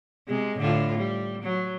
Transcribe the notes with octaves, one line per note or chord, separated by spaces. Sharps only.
C3 G#3
A2 D3 F4
G3
F#3